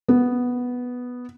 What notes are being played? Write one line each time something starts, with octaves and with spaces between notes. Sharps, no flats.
B3